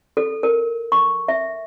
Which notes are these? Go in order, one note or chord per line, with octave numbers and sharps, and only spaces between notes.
A4
A#4
C#6
E5